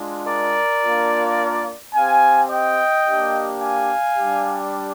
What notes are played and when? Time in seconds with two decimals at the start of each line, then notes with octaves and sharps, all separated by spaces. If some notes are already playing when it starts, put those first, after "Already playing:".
Already playing: G#3 D4 F4
0.28 A#4 D5
0.84 A#3 D4 F4
1.94 C4 G4 F5 G#5
2.50 D#5 G5
3.06 A#3 D4 G4
3.61 F5 G#5
4.17 G3 D4 G4